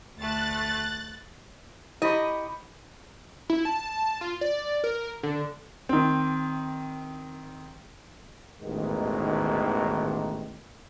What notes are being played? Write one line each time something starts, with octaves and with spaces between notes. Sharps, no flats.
D2 A3 F#6 A6
E4 G4 D#5 B5 C#6
E4
A5
F4
D5
A#4
D3
D#3 C4
A1 D#2 G#2 B2 D#3